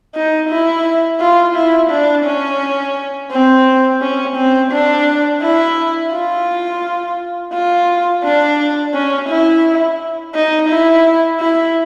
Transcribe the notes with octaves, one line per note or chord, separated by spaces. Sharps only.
D#4
E4
F4
E4
D4
C#4
C4
C#4
C4
D4
E4
F4
F4
D4
C#4
E4
D#4
E4
E4